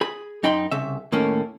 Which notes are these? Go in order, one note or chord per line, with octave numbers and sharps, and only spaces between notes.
G#4 B5
F#2 D#4 G5 B5 C6
C2 C#3 E5
D#2 A2 A#3 C#4